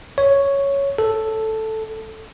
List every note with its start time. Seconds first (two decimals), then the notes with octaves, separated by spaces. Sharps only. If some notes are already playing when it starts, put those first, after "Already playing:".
0.18 C#5
0.98 A4